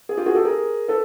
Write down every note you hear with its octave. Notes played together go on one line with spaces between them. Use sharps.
G#4
F4 G4
F#4 G#4
G4 A4
G#4 A#4
A4 B4